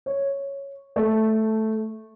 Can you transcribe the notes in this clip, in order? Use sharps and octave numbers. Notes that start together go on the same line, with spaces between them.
C#5
A3